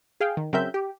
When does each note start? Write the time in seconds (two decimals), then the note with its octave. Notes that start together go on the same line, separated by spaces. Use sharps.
0.20 G#4 F5 G5
0.37 D#3
0.53 C#3 F#3 C4 A#4 E5 G6
0.74 G4